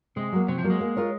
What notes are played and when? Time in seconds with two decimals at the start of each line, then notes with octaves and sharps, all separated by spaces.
0.16 C3 G#3
0.32 F#3 A#3
0.48 C3 F#3
0.58 F3
0.64 F#3 A#3
0.70 G#3
0.81 A#3
0.96 F4 A#4 C#5